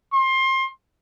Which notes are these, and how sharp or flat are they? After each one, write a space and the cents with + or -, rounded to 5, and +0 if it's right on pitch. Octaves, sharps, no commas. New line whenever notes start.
C6 +25